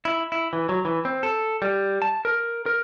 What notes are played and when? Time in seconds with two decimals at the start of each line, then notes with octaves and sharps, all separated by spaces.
0.05 E4
0.32 E4
0.53 E3
0.69 F#3
0.85 E3
1.05 C4
1.23 A4
1.62 G3
2.02 A5
2.25 A#4
2.66 A#4